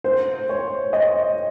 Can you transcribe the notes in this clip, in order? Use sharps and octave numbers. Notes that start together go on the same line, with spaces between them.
C5
C#5
D#5